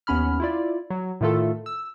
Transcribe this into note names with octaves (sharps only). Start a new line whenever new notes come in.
D#2 B3 C#4 B5 F6
E4 F4 D5
F#3
A2 D#3 A3 F4 A4
E6